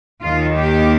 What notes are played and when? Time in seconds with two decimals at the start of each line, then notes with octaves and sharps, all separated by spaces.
0.22 D#2 D#3 F4
0.55 G4